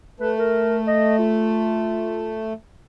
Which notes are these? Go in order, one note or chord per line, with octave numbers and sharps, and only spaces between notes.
A3 B4
A#4
D#5
F4